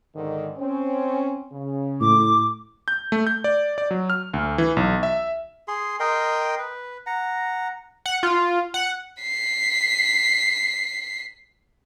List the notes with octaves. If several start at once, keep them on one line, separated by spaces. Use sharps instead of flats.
G#2 D3 D#3
C4 C#4
C#3
A2 D6
G6
A3
G6
D5
D5
F#3
F6
D2
E3
B1
E5
G#4 C6
A#4 D#5 G5 C6
B4
F#5 A#5
F#5
F4
F#5
B6 C7